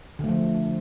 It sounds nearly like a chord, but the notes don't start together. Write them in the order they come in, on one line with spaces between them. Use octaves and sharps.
D3 A3 F3